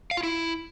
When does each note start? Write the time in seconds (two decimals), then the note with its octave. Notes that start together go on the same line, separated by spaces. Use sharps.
0.11 F5
0.17 F4
0.23 E4